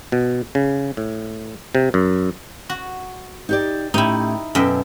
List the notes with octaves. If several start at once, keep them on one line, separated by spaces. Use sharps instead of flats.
B2
C#3
A2
C3
F#2
F#4
D#4 G4 D5
A2 C#4 D#4 E4 G4
F#2 B2 A4 E5 G5